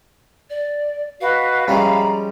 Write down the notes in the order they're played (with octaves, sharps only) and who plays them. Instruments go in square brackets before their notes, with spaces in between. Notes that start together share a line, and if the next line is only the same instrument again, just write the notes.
[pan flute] D5
[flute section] F#4 B4 D#5 [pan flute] F5
[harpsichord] F3 G#3 C#4 [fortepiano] G3 [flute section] E5 A#5 B5